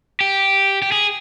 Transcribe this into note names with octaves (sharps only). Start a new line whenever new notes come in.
G4
G4
G#4